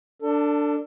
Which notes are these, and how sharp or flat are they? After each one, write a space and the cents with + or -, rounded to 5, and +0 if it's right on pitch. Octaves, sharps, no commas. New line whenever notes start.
D4 +0 A4 +30